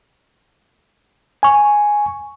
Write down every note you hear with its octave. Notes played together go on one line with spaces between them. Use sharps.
G#5 C#6